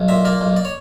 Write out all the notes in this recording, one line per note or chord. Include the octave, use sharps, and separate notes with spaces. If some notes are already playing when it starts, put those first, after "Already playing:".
Already playing: B1
A#2 E5
A#3 D5
B1
D5
C#5